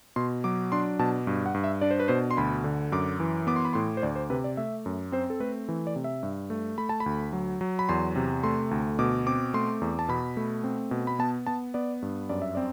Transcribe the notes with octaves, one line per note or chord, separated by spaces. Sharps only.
B2 C6
F#3 D6
D4 C6
B2 A5
G2
F#5
G2
E5
D4 D5
C5
B4
B2 C5
C6
D2 B5
D3
F#2 D6
E3
B3 D6
C6
B5
A2 C6
C5
D2 D5
C5
C3 B4
D5
A3 E5
F#2
C4 C5
A4
A3 B4
E3
D5
C3
E5
G2
A3
A3 B5
A5
B5
D2
F#3
F#3
B5
E2 C6
C3
A3 C6
D2
B2 D6
C4 D6
A3 C6
E2
A5
B2 B5
A3
C4
B2
B5
B3 A5
B3 A5
B3 D5
G2
F#2 D5
E5
C4 D5